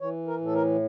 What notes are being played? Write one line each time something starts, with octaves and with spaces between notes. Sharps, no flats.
E3 C#5
A#4
A2 A4
A#4